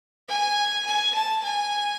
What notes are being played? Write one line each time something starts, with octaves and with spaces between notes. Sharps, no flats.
G#5
G#5
A5
G#5